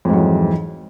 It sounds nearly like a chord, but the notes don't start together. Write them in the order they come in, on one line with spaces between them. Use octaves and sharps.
F2 G#2 F#3 E3